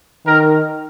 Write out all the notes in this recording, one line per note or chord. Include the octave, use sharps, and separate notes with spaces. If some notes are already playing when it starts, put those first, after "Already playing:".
D#3 A#4